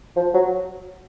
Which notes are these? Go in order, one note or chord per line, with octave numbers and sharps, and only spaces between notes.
F3
F#3